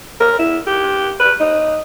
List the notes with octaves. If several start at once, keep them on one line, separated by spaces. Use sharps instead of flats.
A#4
E4
G4
B4
D#4